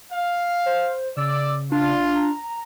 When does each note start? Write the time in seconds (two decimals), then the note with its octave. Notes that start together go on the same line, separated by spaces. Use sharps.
0.12 F5
0.66 C5
1.17 C#3 D5 E6
1.72 D4 F4
2.15 A#5